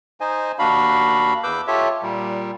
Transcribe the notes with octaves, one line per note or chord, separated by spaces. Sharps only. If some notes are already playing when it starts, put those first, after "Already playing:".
D#4 C5 D#5 G#5
D#2 D4 F#4 F5 B5
E2 B4 D6 E6 G6
F4 G4 A4 C#5 E5
A#2 G3